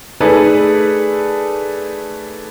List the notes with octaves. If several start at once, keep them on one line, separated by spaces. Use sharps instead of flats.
A3 D#4 G#4 A4 B4 D5